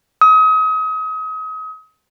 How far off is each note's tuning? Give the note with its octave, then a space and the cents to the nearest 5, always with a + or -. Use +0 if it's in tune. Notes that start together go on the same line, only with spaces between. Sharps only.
D#6 +35